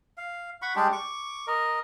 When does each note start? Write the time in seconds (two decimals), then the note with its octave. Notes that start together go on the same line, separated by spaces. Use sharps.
0.17 F5
0.62 F#5 B5 C#6
0.76 G3 G#3 D4 G4
0.92 C#6 D6
1.47 A#4 D#5